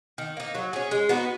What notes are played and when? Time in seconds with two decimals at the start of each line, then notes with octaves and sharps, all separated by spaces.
0.18 D#3
0.37 A#3 D#4
0.55 F#3
0.73 C#4 G#4
0.91 G#3
1.09 B3 D#4 F#4